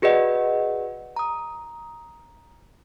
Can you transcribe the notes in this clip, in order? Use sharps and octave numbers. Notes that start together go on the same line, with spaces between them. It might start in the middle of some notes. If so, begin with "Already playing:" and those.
F#4 G#4 B4 D5 D#5 F#5
A#5 D#6